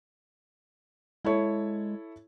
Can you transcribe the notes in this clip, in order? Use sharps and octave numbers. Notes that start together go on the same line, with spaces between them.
G#3 E4 A4 C#5